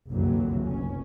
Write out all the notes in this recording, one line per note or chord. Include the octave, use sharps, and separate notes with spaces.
F#1 C2 F2 D3 E3 F#3
F1 C#4